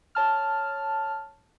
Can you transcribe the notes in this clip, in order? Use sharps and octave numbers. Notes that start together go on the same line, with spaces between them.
C#5 A5 F6